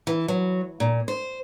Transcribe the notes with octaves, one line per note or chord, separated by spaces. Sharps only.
E3
F#3
A#2
C5